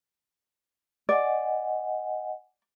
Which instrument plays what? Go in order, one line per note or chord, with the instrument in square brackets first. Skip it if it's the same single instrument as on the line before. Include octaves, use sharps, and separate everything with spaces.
[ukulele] D5 [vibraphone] D#5 F#5 G#5